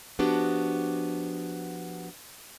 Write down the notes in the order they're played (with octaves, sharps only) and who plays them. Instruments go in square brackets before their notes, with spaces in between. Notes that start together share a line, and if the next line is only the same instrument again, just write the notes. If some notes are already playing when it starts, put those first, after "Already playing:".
[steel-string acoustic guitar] F3 B3 D4 F#4 G4